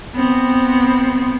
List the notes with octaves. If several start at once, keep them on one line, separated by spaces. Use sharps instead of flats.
B3 C4